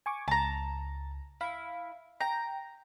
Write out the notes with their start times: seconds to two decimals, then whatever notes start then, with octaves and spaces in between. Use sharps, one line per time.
0.06 G#5 C#6 D6
0.28 C#2 A5 A#5
1.41 E4 F5
2.20 G5 A#5